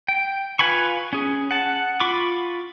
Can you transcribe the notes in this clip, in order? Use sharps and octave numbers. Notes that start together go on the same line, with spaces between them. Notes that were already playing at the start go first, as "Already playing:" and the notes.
G5
F4 B4 G#5 B5 C#6
C#4 G#4
F#5 A5
F4 B5 C#6 D6